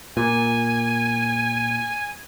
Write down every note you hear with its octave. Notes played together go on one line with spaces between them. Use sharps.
A#2 G#5